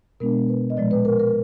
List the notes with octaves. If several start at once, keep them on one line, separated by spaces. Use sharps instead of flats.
B2 G#3 B3 D4 A#4
B4
D#5
A#2 F3 G#3 D5
B4
A#4
A#4